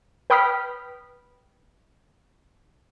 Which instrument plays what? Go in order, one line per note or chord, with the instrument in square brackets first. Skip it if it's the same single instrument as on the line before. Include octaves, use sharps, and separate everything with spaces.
[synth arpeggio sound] B4 G5 B5 D#6 F6 B6